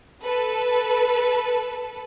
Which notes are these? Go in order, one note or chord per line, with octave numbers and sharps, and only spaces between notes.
A4 B4